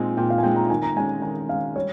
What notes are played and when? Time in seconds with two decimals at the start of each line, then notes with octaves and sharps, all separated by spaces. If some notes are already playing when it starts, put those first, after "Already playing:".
Already playing: A#2 G#3 C4 D#4 G#5
0.17 A#2 G5
0.30 F5
0.38 G#5
0.43 G#3 C4 D#4 G5
0.56 A#5
0.70 D#3 G#5
0.83 A#5
0.96 G#3 C#4 G#5
1.22 D#3 G#5
1.49 G#3 C#4 F5
1.76 G3 C#5